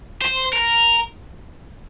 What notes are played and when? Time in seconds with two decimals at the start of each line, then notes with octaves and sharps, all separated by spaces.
0.22 C5
0.53 A#4